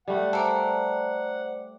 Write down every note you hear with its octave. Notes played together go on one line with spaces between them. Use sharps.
G3 A3 F#5
A4 A#4 C5 D5 E5 D6